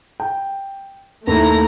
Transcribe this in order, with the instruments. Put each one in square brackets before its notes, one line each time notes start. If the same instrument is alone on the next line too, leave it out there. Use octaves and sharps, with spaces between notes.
[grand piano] G5
[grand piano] D#2 [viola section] A3 E4 [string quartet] A#5